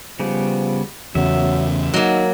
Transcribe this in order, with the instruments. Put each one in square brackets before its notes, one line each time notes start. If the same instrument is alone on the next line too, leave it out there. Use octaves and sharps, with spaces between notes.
[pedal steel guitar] C#3 G3 B3 [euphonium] F3
[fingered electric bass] E2 C#3 [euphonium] F#3 [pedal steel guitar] E5
[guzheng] F#3 A#3 [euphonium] D#4